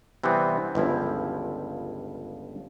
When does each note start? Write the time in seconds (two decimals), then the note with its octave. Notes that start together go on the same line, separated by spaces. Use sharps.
0.24 C3 E3 G3 B3 C4
0.75 G1 C#2 F3 E4